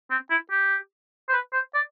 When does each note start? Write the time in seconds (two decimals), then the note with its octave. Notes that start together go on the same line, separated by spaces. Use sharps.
0.10 C4
0.30 E4
0.51 G4
1.29 C5
1.33 B4
1.53 C5
1.74 D5